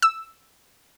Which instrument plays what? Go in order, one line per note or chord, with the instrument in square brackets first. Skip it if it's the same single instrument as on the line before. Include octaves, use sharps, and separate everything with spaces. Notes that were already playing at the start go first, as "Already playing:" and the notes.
[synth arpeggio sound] E6